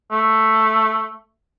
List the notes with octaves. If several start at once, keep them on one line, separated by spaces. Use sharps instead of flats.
A3